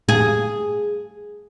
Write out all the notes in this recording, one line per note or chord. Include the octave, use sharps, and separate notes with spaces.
G#4